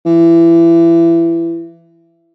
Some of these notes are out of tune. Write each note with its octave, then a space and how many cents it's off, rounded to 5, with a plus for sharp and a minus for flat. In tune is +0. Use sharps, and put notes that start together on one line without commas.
E3 +25